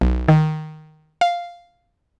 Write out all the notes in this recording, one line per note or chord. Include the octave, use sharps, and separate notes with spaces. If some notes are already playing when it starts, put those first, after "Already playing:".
B1
D#3
F5